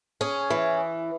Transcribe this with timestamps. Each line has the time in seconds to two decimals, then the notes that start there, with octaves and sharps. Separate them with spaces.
0.21 C#4 G#4
0.50 E3